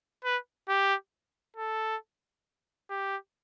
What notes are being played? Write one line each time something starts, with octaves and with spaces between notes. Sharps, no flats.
B4
G4
A4
G4